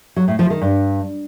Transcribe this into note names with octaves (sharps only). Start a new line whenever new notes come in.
F#3
A2
F3
D#3
G2